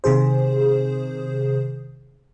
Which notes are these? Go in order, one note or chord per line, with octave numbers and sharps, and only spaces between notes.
C3 D#3 G#4 C5